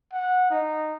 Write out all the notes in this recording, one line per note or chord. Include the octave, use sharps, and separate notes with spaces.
F#5
D#4